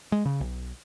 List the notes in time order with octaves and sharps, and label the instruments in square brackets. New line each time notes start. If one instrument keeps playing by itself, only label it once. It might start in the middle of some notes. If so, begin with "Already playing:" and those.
[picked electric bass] G#3
C#3
B1